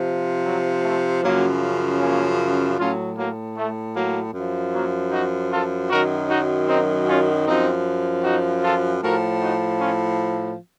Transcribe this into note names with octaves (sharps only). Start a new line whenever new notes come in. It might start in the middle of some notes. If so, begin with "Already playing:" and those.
Already playing: C3 F3
F#3
A3
F#2 C#3 F3 F#3 A#3
A#3 C#4
A2 F#3 C#4 F4
F#3 A#3
A3
F#3 A#3
F#2 F3
F#3 A#3
D#4 F#4
F4 A4
F#2 D#3 F#3 F#4 A#4
D#4 F#4
C4 D#4
C#4 F4
F#2 F3 C4 D#4
D#4 F#4
F4 A4
A2 F3 F#4 A#4
D#4 F#4
C#4 F4